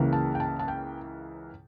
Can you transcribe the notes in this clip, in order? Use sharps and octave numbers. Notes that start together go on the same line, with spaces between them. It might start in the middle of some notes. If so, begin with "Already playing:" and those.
Already playing: C#2 C#3 E3 A#3
A5
G5
A5
A5
G5